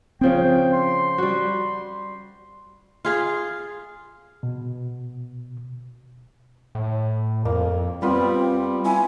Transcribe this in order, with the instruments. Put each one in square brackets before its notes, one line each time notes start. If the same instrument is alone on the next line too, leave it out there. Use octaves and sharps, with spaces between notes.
[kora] C#3 F3 G#4 [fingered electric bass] C4 [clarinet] G5
[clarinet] C6
[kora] G3 F#4
F4 G#4 F5
[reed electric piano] B2
[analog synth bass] A2
[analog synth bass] F2 [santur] A#3
[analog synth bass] G3 [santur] B3 F4 B5 [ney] C4
[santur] E4 [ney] G#5